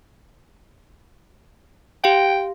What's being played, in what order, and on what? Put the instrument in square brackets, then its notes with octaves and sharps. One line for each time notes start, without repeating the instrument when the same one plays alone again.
[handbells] G4 F5 [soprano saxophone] G5